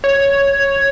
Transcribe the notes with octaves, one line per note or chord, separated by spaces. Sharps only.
C#5